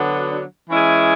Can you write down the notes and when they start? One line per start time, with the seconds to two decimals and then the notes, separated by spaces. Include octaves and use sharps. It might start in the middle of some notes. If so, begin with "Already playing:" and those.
Already playing: D3 F#3 B3 D4 F#4
0.69 E3 G#3 C#4 E4 G#4